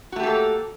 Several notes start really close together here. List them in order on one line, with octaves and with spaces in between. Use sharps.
F#4 A3 G4 A4 A#3